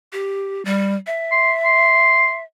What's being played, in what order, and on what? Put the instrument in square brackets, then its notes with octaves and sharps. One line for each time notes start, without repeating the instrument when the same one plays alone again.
[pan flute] G4
G3
E5
[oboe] C6
C6